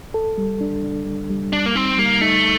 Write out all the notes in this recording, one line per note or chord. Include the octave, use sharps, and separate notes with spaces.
A4
G3
D4
D4
G3
G3
G3 D4
A#3
C4 D#4
G3 A#3
A3 D#4